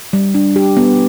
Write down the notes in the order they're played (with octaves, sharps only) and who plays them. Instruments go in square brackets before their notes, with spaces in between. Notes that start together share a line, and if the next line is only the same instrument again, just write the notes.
[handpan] G3
D4
G4
B3